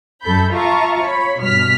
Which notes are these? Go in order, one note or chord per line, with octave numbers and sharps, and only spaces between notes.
F#2 A4 B5 G6
F4 E5 F5 A5 A#5 C#6
C#5 B5
G2 B2 F6 B6